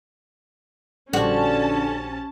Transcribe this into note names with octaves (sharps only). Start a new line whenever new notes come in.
A#1 D3 C#4 F#4 G4 C5 A5